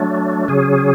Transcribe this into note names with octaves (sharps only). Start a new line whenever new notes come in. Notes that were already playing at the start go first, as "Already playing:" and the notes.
Already playing: F#3 A3 D4
C#3 F#3 C#4 G#4